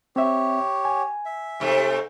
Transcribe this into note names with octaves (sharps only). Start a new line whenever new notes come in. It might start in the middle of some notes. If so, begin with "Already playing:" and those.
C4 G4 C#5 E5
G#5
E5
G#2 C3 A3